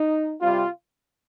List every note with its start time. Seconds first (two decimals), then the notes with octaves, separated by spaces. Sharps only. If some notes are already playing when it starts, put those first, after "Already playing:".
Already playing: D#4
0.41 C3 G3 C4 F4